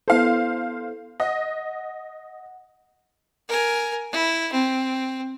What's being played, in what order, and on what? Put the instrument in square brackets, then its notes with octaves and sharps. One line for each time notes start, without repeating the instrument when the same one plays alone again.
[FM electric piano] B3 E4 A4 [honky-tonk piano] C5 F5
[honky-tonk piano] D#5 [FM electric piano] F#5
[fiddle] A#4 G#5
E4
C4